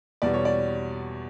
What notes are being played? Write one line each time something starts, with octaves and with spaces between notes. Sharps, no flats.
E2 B2 G3 D5
C#5
D5